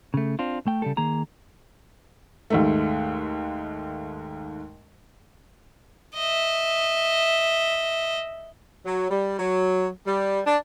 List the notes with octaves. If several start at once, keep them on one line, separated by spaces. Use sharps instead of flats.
C#3 A3
C4 D4 F4
A3 G5
C#3 G3 A4
D#3 A#3 G#4 A#5
D#2 G#2 A3
D#5 E5
F#3
G3
F#3
G3
D4